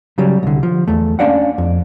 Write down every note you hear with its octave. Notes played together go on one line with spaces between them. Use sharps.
C#3 F#3 G3
C2 D3
F3
E2 A3
A#3 C#4 D4 D5 F5 F#5
F2